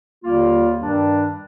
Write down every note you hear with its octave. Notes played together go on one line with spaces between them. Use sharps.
D#2 D3 G3 A#3 F4
G2 D#3 G3 D4